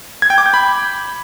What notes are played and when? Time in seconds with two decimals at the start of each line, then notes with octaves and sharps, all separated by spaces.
0.22 G#6
0.30 G5
0.38 D6
0.46 G6
0.54 B5